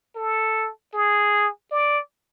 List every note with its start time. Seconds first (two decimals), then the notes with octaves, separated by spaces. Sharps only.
0.16 A4
0.93 G#4
1.71 D5